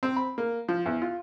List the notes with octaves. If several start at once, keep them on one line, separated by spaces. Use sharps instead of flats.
C4
B5
A#3
F3
E2
F4